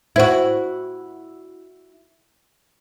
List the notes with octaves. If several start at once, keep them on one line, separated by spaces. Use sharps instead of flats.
E4 F#4 C5 G#6